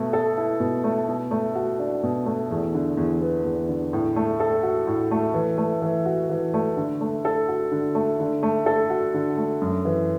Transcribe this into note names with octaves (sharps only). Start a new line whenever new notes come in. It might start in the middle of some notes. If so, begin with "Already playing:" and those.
Already playing: B2 A3
A4
E4
B2
A3
B2
A3
F#4
D4
B2
A3
E2
D3
E2
B3
E2
D3
A2
A3
A4
F#4
A2
A3
E3
A3
E3
F#4
E3
A3
D3
A3
A4
F#4
D3
A3
D3
A3
A4
F#4
D3
A3
F#2
E3